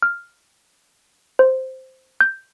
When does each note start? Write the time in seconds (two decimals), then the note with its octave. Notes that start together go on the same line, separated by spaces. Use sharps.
0.02 F6
1.39 C5
2.21 G6